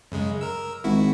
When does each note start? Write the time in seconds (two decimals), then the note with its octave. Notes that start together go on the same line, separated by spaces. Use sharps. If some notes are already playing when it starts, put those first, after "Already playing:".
0.12 F#2 C#3 G#3
0.41 A#4 E6
0.84 G#1 E4 F#4